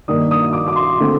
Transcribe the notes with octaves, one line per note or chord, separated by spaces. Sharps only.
G2 D#3 A#3 D4 D#6
D#6
D6
D6
C6
D3 A3 C4